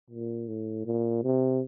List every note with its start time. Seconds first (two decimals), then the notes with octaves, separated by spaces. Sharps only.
0.11 A#2
0.48 A2
0.85 A#2
1.23 C3